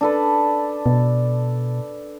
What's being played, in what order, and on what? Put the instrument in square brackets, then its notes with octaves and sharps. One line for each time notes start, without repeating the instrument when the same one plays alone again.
[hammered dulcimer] D4 A4 B4
[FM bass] B2